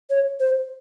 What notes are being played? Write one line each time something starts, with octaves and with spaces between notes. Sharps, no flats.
C#5
C5